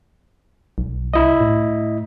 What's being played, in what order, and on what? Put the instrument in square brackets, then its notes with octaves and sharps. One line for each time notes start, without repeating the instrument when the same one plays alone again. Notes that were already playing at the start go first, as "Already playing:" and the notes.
[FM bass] B1
[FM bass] C2 [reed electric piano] E4 D#5
[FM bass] A2